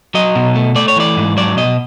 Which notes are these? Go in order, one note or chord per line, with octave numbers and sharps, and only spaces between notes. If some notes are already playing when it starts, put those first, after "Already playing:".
F#3 D#5
B2
A3
A3 D5
C#5
E3 D5
G#2
F#3 D5
B2 D#5